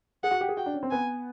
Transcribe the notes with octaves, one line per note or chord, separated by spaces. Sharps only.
G#4 F#5
F#4
G4
G#4
F#4 G5
D4
C#4
C4
B3 G#5